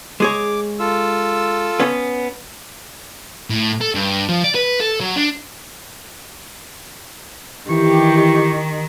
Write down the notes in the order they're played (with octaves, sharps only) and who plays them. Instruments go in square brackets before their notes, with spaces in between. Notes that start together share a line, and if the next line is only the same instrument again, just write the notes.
[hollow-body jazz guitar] G#3 G#4 C#5 [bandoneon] D6
[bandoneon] F4 A4 E6
[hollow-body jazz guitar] B3 C#4
[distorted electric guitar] A2
A4
G2
F3
D5
B4
A4
F#3
D4
[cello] D#3 [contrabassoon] E3 [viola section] G4 [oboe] C#6